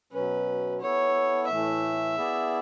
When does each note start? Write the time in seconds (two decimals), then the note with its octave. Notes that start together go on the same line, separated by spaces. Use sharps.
0.12 B2 F#3 C#4 B4
0.80 B3 E4 A4 C#5
1.47 A2 E3 A3 E5
2.16 B3 E4 G#4 D5